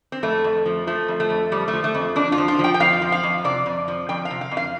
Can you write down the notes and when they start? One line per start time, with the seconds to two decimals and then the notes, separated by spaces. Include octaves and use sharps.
0.12 C4
0.23 F2 A3
0.44 F2
0.66 F3
0.87 F3 A3
1.08 F2
1.20 A3
1.30 F2
1.51 F3 G3
1.68 A3
1.73 F3
1.84 A3
1.95 F2
2.16 F2 D4
2.32 F4
2.38 F3
2.48 F4
2.59 F3
2.64 G5
2.74 G5
2.80 F2 F5
3.02 F3
3.12 F5
3.23 F2
3.44 C3 D5
3.66 F2
3.88 F3
4.09 F2 G5
4.25 F5
4.31 C3
4.41 F5
4.51 F2
4.57 F5